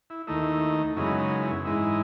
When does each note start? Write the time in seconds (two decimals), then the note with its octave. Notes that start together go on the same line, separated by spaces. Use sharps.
0.10 E4
0.27 D#2 D#3 A3 D#4 E4
0.96 F#2 C#3 G#3 B3 D#4 E4
1.19 D#4
1.42 E4
1.65 G#2 E3 G#3 D#4 E4